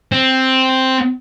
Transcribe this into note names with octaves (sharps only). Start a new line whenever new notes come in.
C4